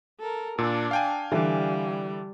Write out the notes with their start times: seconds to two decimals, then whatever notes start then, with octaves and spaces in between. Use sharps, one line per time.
0.20 A4 A#4
0.58 A#2 D4 A5 E6
0.91 F5 G5 G#5
1.32 D3 E3 G3